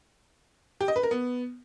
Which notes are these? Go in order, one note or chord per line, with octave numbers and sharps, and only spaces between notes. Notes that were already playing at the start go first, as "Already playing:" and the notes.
G4
D#5
B4
A#4
B3